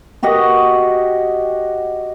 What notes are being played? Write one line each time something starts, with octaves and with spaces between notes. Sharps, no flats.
F#4 G4 D#5 F#5